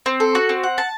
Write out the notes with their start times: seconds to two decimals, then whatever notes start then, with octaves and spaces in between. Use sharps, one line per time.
0.06 C4
0.20 A4
0.35 F#4
0.49 C4
0.63 F#5
0.78 A5